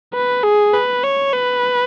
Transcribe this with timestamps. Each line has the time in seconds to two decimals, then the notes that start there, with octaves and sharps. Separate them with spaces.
0.14 B4
0.43 G#4
0.74 B4
1.04 C#5
1.33 B4